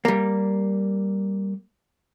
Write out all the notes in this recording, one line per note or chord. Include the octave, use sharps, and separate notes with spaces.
G3 A#3